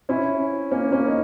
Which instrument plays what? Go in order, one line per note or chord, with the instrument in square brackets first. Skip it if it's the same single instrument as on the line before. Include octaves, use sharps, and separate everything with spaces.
[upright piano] C#4 E4
A#3 C#4
A#3 C#4
D#4